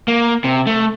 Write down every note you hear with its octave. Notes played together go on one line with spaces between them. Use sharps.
A#3
C3
A3